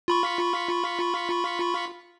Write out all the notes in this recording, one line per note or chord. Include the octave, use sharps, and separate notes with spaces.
F4 B5 C#6